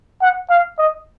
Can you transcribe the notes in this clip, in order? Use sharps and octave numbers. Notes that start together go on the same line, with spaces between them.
F#5
F5
D#5